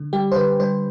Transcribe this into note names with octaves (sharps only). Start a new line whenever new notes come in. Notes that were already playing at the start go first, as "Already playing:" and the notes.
Already playing: D3
G3 G4
C5
D3 B4
G3 C5